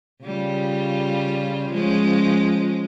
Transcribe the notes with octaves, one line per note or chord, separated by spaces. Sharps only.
C#3 G3 F4
F3 G#3 C#4